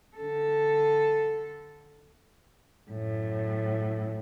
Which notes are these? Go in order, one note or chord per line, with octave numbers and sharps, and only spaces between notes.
D3 A4
F#2 A2